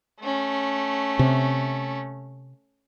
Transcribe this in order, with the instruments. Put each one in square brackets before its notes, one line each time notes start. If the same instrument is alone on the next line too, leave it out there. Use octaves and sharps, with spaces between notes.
[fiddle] A3 C#4
[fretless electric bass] C3